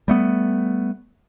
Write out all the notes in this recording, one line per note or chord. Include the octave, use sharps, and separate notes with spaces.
G3 A3 B3